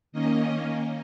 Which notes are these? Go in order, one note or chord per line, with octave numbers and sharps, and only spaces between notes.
D#3 A#3 C#4 D#5